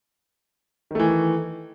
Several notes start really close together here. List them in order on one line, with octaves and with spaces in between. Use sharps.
D#3 A3 E3